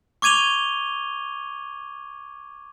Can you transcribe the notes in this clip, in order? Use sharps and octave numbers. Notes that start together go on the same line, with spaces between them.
C#6 D6 G#6 D#7 F7 G7